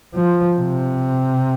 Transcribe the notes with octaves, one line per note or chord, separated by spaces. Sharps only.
F3
C3